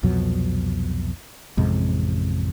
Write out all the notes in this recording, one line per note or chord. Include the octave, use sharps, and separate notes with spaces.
C2 F2 B2 F#3
A1 F2 C3 G#3